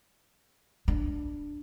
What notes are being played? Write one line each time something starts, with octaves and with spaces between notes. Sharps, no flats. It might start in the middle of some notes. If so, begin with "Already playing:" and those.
D4